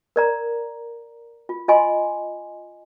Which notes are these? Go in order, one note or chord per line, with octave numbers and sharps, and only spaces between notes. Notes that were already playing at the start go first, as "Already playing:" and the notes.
A#4 D5 A#5
F4
F4 D#5 G#5 C6